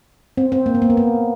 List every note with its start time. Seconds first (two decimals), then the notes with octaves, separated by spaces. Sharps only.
0.37 C4
0.52 C4
0.66 A#3
0.75 B3
0.82 A#3
0.90 B3
0.97 A#3